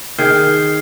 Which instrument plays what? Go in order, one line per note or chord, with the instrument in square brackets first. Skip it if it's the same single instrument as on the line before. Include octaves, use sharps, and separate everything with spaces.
[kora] D#3 G#4 [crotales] F6 G6 C7